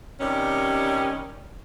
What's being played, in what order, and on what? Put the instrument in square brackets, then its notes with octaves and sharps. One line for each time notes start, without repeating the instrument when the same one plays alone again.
[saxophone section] C3 D#3 G3 C#4